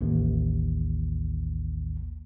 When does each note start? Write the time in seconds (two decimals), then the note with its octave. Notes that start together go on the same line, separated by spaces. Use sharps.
0.01 A1 D#2